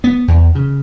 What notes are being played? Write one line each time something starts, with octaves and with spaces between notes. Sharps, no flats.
B3
E2
C#3